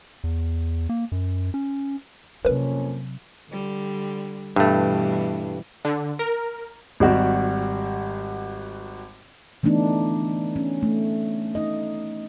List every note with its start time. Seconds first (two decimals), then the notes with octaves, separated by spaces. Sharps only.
0.24 E2
0.89 A#3
1.12 F#2
1.54 C#4
2.45 F2 C3 F#3 A#3 C#4 A#4 B4
3.49 D3 G3
4.56 G2 B2 E3 G3 A3
5.85 D3
6.19 A#4
7.00 G#1 G3 F#4 G4
9.63 E3 A3 B3 D4 D#4
10.56 C#4
10.83 A3
11.55 D#4 D#5